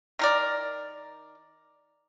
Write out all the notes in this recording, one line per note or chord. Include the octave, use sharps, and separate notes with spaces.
D#3 A#4 D5